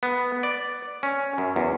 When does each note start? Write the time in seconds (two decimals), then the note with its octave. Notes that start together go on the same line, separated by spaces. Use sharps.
0.03 B3
0.43 D5
1.03 C#4
1.38 F#2
1.56 E2